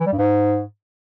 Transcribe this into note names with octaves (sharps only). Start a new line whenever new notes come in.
E3
G3
G2
G#2